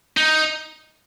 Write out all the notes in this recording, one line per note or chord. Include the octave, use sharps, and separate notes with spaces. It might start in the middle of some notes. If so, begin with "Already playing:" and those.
D#4